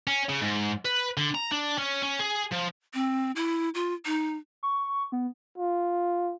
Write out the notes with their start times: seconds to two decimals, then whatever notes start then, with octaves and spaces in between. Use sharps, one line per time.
0.07 C#4
0.29 C#3
0.41 G#2
0.85 B4
1.17 D3
1.35 A#5
1.51 D4
1.78 C#4
2.02 C#4
2.19 G#4
2.51 F3
2.94 C4
3.36 E4
3.75 F4
4.06 D#4
4.63 C#6
5.12 B3
5.58 F4